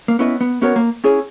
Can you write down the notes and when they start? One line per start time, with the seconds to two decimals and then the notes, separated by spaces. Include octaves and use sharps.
0.08 A#3
0.19 B3 C#4 E4 B4 D#5
0.41 B3
0.61 B3 C#4 F#4 A#4 C#5
0.76 A#3
1.04 C#4 E4 G#4 C#5